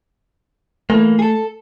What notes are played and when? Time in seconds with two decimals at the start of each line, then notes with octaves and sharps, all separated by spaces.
0.90 E3 A3 A#3
1.19 G#4 A4